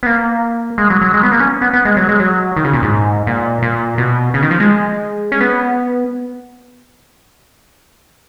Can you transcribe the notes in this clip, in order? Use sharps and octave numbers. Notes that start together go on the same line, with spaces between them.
B3
A#3
G#3
F#3
F#3
G#3
B3
A#3
C#4
B3
B3
G#3
F#3
G#3
F#3
D#3
C#3
A#2
G#2
A#2
A#2
B2
C#3
D#3
F3
G#3
C#4
B3